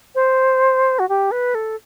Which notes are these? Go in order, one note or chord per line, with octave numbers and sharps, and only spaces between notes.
C5
F#4
G4
B4
A4